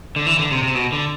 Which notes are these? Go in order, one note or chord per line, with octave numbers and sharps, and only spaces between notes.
D3
E3
D3
C3
C3
B2
D3